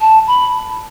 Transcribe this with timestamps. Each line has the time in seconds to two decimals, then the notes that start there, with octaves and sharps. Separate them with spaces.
0.01 A5
0.27 B5